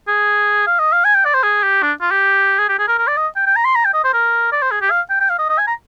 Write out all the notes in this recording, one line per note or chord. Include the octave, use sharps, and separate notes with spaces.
G#4
F5
D#5
F5
G#5
G5
D5
C5
G#4
G4
D4
F4
G4
G#4
G4
G#4
A#4
A#4
D5
D#5
G5
G5
A#5
C6
A#5
G5
D#5
C5
A#4
D5
C5
G#4
G4
F5
G5
G5
F5
D#5
D#5
G#5
A#5